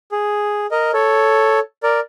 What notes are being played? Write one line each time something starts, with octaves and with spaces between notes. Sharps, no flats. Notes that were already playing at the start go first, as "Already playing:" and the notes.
G#4
A#4 D#5
A4 C#5
A#4 D5